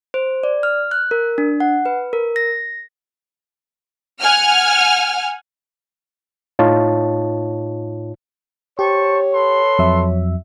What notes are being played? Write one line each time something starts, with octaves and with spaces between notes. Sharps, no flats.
C5
D5
F6
F#6
A#4
D4
F#5
B4
A#4
A#6
F#5 G#5 F6
A2 D#4 F4 C#5 A5
G4 C5 C#5 A5 C#6
A4 B4 C6
F2 F#3 E5